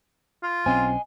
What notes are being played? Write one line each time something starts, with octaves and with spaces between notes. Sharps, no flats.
F4
B1 C4 C#4 D#5 G#5